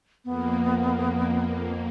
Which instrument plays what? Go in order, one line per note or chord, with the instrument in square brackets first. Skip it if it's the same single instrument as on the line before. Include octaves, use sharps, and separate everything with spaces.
[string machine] F2 A#3 [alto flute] B3